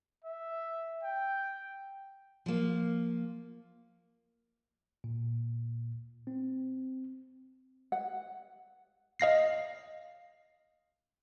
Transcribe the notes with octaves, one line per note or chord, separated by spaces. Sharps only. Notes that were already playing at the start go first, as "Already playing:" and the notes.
E5
G5
F3 A#3
A#2
C4
F#5
D#5 F5 A#6 C7